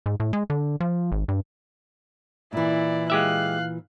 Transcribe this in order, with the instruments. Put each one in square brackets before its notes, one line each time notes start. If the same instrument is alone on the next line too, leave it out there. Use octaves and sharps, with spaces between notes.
[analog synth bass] G#2
A2
G#3
D3
F3
G#1
G2
[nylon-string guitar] A#2 E3 [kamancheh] E4 D5
[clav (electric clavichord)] G#3 G4 E5 [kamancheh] F5 F#6